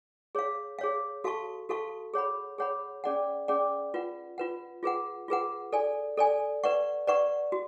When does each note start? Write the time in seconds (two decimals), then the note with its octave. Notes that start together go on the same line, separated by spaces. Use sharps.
0.35 G#4 C#5 F5
0.79 G#4 C#5 F5
1.24 F#4 A4 F5 A5 C#6
1.69 F#4 A4 F5 A5 C#6
2.14 G#4 C#5 F#5 B5
2.58 G#4 C#5 F#5 B5
3.04 C#4 G#4 D5 F#5
3.48 C#4 G#4 D5 F#5
3.94 F4 B4 F#5
4.38 F4 B4 F#5
4.83 F4 G#4 B4 F#5
5.28 F4 G#4 B4 F#5
5.73 A4 D5 G#5
6.17 A4 D5 G#5
6.64 B4 D5 F#5 C#6
7.08 B4 D5 F#5 C#6
7.52 F#4